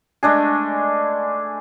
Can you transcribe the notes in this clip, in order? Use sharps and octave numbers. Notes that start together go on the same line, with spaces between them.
G#3 A3 D4 G#4